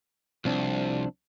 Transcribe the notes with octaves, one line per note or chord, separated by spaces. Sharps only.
C2 F3 C4 D4